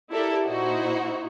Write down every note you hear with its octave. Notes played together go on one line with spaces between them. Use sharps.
E4 G4 A4 A#4 D5 E5
A#2 D#4 E4 F#4 C5